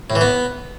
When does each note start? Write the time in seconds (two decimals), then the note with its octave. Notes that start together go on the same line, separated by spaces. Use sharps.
0.10 A2
0.15 E3
0.21 B3